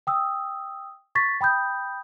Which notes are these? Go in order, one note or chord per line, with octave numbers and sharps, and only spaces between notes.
G5 D#6 E6
C#6 A6 B6
G5 B5 D#6 G6